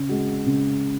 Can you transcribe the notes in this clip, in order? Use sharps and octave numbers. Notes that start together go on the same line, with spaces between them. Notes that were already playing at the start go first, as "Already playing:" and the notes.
Already playing: C#3
G#3 F#4
C#3